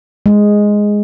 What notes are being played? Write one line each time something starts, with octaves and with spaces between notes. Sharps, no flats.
G#3